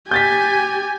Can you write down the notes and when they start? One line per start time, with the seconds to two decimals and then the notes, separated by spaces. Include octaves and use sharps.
0.11 G4 G#5 G6 A6 B6